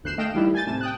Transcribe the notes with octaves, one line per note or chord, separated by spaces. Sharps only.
G1 D2 F#6 G6 C7 E7
A3 D#5 F5 G5 D7 E7
D#3 G3 E4
G#5 G6 A6
A2 C3 A5 E7
G5 D#6 F#6